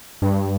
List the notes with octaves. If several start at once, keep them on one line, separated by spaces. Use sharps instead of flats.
G2